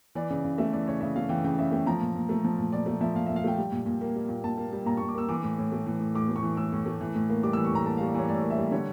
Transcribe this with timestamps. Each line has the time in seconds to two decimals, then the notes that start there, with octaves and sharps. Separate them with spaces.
0.15 E3 D5
0.30 C#3
0.44 C#3
0.58 A3 E5
0.73 E3 D5
0.88 C#3 C#5
1.01 C#3 E5
1.16 A3 F5
1.29 E3 G5
1.44 C#3 G5
1.59 C#3 E5
1.72 A3 G5
1.87 F3 A#5
2.01 A#2
2.15 A#2
2.29 A3
2.44 F3
2.58 A#2
2.72 A#2 D5
2.86 A3 D5
3.01 F3 E5
3.15 A#2 F5
3.27 E5
3.30 A#2
3.36 F5
3.44 A3 G5
3.58 G3
3.72 A#2
3.86 A#2
4.01 A#3
4.16 G3
4.29 A#2
4.44 A#2 A5
4.58 A#3
4.73 G3
4.86 A#2 A#5
4.97 C#6
5.01 A#2
5.08 D6
5.15 A#3 E6
5.29 E3 D6
5.43 A2
5.58 A2
5.72 A3
5.86 E3
6.00 A2
6.15 A2 D6
6.28 A3
6.36 C#6
6.43 E3
6.57 A2 E6
6.72 A2
6.86 A3
7.01 E3
7.15 A2
7.30 A#3
7.43 G3 D6
7.53 E6
7.57 E3
7.65 C#6
7.71 A2 A#5
7.86 A#3 A5
7.97 F5
8.01 G3
8.07 D5
8.14 E3 C#5
8.29 A2 D5
8.43 A#3
8.50 E5
8.58 G3
8.72 D3 C#5